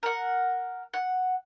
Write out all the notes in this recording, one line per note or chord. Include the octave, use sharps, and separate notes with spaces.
A#4 F#5
F#5